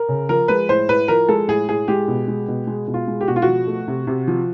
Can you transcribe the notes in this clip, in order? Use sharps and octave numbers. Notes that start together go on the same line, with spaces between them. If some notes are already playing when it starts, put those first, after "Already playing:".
Already playing: A#4
C#3
F3 A#4
G#3 B4
A2 C5
A2 B4
F3 A#4
G#3 A4
A2 G#4
A2 G#4
G#3 G4
B2
G#3
B2
G#3
B2
F4
G#3
G4
B2 F#4
F4
F#4
F3
A3
C3
C3
F3